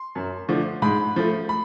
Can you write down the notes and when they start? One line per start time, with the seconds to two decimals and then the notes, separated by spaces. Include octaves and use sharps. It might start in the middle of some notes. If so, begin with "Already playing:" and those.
Already playing: C6
0.15 F#2
0.49 D3 F3 A3
0.82 G#2 B5
1.16 F3 A3
1.49 B5